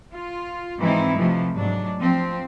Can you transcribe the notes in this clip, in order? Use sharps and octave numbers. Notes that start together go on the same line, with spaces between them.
F4
G#2 E3 F3 C4 D#4 E4
C3 E3 F3 A3
G#2 F#3 D4
F3 C4